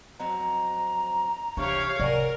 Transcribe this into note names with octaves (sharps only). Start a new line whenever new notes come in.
F2 F#3 C4 A#5
C3 E3 F3 D4 G4 C#5 F5 C#6
C3 A#4 D5 F#5 G#5